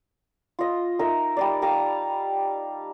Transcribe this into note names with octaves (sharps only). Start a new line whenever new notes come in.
F4 D#5
D#4 A#4 E5
G3 D#4 D5
G4 F5 A5 A#5